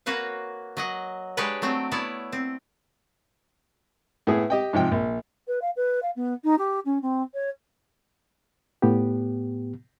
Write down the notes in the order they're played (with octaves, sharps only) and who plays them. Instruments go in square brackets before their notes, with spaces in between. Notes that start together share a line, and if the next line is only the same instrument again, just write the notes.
[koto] A#3 F#4 B4 C#5 F5
F#3 D#5 F#5
G#3 D4 G4 B4 C#5 D5
F#3 A3 C4 G5
B3 E4 C#5 D5
C4
[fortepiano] A2 B3 G#4
G4 D#5 G5
G#2 C3 F3 G5
A#1
[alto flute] B4
F5
B4
F5
B3
D#4
G4
C#4
C4
C#5
[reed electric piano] A2 B3 G4